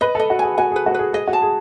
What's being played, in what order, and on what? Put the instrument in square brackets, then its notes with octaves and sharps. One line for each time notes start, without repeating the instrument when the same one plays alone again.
[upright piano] B4 [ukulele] D#5
[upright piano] A4 [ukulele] D#5
[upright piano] F#4
[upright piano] G#4 [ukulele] G#5
[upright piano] F#4 [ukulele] G#5
[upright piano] G#4 [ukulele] B4
[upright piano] F#4
[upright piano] G#4 [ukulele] B4
[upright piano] G#4 [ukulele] D#5
[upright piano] F#4
[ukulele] A5
[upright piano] G#4